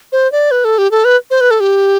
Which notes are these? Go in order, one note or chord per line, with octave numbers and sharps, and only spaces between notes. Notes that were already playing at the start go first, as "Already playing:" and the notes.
C5
D5
B4
A4
G4
A4
B4
C5
B4
A4
G4